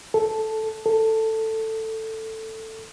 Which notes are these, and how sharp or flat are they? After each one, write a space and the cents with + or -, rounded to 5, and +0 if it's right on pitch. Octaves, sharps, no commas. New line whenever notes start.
A4 -5
A4 +10